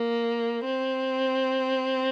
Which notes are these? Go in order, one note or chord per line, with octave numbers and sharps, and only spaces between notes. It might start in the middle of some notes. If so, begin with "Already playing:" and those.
Already playing: A#3
C4